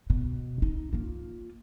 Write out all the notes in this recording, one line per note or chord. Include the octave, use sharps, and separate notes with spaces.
B2
D#4
A#3 F4